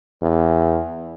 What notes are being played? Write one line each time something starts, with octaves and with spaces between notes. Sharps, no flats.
E2